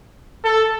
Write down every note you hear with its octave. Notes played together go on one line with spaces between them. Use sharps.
A4